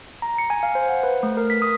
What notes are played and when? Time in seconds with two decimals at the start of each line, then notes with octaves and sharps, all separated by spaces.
0.22 A#5
0.38 C#7
0.50 G#5
0.63 F5
0.75 C5
0.89 F#5
1.03 B4
1.23 A3
1.37 A#4
1.50 B6
1.62 D#6